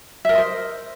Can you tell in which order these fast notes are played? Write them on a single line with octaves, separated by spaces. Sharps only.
E5 A#4 D#5 C5